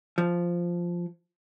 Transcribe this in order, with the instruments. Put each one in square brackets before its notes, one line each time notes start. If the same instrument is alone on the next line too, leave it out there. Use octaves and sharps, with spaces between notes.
[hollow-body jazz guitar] F3